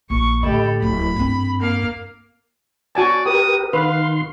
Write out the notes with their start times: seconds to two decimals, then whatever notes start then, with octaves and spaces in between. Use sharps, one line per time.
0.10 A#1 C#6
0.43 A2 D3 G4 A4 D#5 B5
0.82 D1 F#3 E4 B5
1.16 G2 C4 D4
1.60 A#3 F5
2.95 F#4 D5 G#5 A5
3.26 G4 A#4 B4 D#6
3.73 D#3 B4 F5 C6